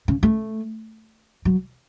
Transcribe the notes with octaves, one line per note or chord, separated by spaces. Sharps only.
C#3
A3
F#3